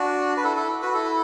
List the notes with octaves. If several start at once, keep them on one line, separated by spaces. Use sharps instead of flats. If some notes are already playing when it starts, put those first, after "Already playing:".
Already playing: D4 F#4
B4
E4 A4
E4 A4
F#4 B4
E4 A4